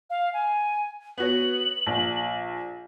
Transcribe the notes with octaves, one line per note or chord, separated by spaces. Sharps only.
F5
G#5
B3 F#4 C#5 F#7
A#1